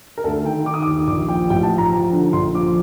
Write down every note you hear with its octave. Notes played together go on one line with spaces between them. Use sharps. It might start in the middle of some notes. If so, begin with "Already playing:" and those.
A#4
D2 A4
D#3 G5
D#3 D6
D#6
D6
D#2
A#1 D6
F3 G5
A1 G5
A5
F3
A#5
F3
D3
A#1 C6
F3 D6